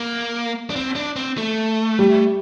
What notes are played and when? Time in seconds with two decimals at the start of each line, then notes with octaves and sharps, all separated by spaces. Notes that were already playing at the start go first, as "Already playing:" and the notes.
Already playing: A#3
0.70 D4
0.76 C4
0.96 D4
1.16 C4
1.38 A3
1.99 G3